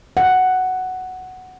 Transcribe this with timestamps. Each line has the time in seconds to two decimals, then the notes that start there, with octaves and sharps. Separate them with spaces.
0.17 F#5